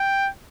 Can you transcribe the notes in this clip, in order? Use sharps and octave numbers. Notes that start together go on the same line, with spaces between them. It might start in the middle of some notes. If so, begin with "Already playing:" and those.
Already playing: G5